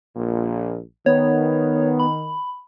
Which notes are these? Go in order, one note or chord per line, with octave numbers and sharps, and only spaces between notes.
A#1 A#2
D#3 B3 C#5
B5